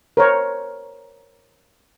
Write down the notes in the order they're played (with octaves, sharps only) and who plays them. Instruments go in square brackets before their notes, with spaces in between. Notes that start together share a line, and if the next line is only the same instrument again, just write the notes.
[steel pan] A#4 C5 C#5